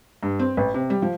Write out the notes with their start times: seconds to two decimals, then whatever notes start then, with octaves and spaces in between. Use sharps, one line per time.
0.23 G2
0.39 C4
0.57 A1
0.74 C3
0.90 G3
1.02 F3